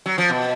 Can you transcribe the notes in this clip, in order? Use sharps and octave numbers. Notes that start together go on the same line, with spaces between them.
F#3
F3
B2